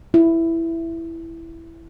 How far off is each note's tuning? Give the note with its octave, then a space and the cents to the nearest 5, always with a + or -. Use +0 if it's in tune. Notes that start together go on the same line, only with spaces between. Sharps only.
E4 +5